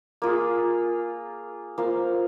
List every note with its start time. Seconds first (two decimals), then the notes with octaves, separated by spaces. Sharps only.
0.22 A#3 F4 G#4
1.78 A#3 F4 C5 F5